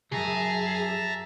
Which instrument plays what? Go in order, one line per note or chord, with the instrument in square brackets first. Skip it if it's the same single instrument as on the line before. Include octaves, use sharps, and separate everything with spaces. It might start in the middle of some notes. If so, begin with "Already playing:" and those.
[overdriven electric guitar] C#2 F#2 [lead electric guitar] G#4 [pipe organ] E5 A5 A#5